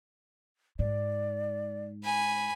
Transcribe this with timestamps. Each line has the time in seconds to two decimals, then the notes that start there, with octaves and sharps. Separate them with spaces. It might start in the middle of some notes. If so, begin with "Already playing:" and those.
0.79 G#2 D5
2.04 G#5 B5